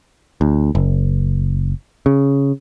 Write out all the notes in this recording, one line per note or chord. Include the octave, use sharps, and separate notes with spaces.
D2
F#1
C#3